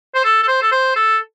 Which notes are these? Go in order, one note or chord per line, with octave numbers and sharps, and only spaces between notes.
C5
A4
A4
C5
A4
C5
A4